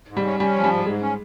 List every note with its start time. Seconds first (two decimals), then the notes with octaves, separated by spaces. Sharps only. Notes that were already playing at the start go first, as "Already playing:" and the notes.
0.09 G#2
0.17 G3
0.25 C#4
0.40 G3 C#4
0.55 F3
0.64 G3
0.71 G#2
0.86 G#2 G#3
1.02 C#4